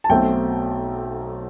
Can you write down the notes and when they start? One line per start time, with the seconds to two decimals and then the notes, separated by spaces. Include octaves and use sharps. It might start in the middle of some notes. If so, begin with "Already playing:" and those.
0.04 A5
0.09 B1 B2 A3 C4 G5